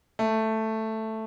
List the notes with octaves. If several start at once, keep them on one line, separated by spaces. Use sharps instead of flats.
A3